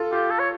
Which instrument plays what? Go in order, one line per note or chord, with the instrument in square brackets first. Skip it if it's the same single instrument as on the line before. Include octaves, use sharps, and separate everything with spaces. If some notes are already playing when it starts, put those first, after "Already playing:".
Already playing: [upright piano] F4 A4
[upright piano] F4 [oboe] G4
[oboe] A4
C#5